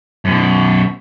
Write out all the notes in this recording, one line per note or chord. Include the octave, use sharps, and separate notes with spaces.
F#2 B2